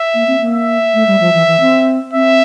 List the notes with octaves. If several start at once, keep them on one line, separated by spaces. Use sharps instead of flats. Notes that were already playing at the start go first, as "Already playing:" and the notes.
Already playing: E5
A#3
C4
A#3
E5
A3
G3
F3
E3
E3
C4
C4 E5